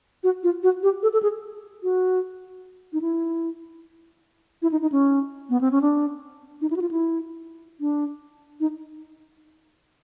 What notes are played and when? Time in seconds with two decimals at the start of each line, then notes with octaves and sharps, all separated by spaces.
0.24 F#4
0.43 F4
0.63 F#4
0.83 G4
1.03 A4
1.13 A4
1.23 G#4
1.83 F#4
2.93 D#4
3.02 E4
4.62 E4
4.72 D#4
4.82 D#4
4.92 C#4
5.50 B3
5.61 C4
5.71 C#4
5.81 D4
6.62 D#4
6.71 E4
6.76 F#4
6.81 F4
6.91 E4
7.80 D4
8.60 D#4